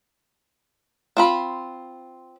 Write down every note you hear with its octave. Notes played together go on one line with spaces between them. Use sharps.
C4 F4 B5